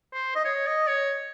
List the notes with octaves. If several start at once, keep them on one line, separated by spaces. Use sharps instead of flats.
C5
D#5
C#5
D#5
C#5